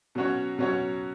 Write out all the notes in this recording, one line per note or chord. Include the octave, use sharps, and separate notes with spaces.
B2 F#3 C#4 F#4 C#5
B2 F#3 C#4 F#4 C#5